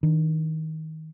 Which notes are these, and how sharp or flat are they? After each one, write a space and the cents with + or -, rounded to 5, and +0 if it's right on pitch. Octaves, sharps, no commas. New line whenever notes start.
D#3 +25 D4 +25